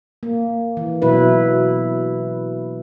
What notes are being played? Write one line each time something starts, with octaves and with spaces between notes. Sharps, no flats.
A#3
E3
B2 F#3 E4 B4